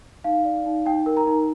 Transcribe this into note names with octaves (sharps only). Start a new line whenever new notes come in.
D#4 F5
D5
D#4
D#4 G5
A#4
A#5
D#4